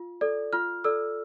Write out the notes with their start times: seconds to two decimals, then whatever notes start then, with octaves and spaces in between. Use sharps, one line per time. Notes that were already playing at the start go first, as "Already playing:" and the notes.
Already playing: F4
0.21 A4 D5
0.53 F4 F6
0.84 A4 D5 E6